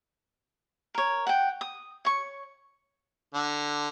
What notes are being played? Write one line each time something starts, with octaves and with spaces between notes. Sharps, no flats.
A#4 C#5
F#5 G5
D#6
C#5 C#6
D3